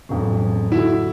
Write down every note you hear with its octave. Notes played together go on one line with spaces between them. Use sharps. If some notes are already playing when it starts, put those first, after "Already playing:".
E1 A1 F2 A2 F#3
D3 E4 F#4 A4